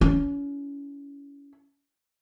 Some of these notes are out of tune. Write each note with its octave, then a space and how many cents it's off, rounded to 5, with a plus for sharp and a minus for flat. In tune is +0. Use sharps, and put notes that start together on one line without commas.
C#4 +30 E4 +15